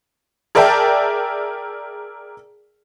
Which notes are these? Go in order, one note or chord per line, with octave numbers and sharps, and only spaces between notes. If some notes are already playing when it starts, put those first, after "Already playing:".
G#4 A#4 D5 E5 G5 A5